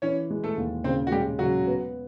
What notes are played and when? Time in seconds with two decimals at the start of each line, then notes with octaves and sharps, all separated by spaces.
0.02 E3 C#4 C#5
0.30 G#3
0.44 A3 A4
0.57 D#2
0.84 C#3 C4 C5
1.07 F#4
1.12 G3 G#3 G4
1.39 C#3 F#3 F#4
1.67 B3